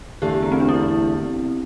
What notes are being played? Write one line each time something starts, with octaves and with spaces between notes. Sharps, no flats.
E2 D3 A3 G4
B3
C4
D4
E4